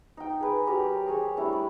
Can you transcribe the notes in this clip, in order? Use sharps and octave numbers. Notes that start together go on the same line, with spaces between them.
D#4 G5
G#4 B4
F#3 G4 A#4 D5
G#4 C#5 G#5
G3 A3 D4 E4
D5